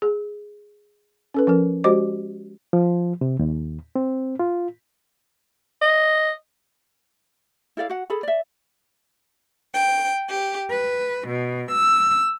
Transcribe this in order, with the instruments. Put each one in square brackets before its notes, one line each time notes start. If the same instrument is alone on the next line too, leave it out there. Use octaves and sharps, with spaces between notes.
[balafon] G#4
C#4 A4 B4
F3 C#4 A#4
G#3 F#4 G4 C5 D#5 D6
[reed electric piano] F3
C3
D#2
C4
F4
[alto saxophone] D#5
[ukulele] E4 A4 D5 F5
F#4 F#5
G#4 A4 B5
D5 E5
[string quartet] G5
G4
B4
B2
E6